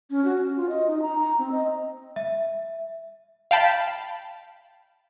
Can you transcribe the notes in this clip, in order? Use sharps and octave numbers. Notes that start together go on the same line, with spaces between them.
C#4
F#4
C#4
F4
D#5
D#4
A#5
A#5
C4
D#5
E5
F5 G5 A5 B5